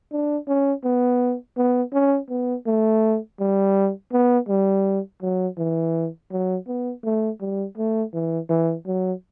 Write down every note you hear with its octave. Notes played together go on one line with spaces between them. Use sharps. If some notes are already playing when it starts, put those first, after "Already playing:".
D4
C#4
B3
B3
C#4
B3
A3
G3
B3
G3
F#3
E3
F#3
B3
A3
G3
A3
E3
E3
F#3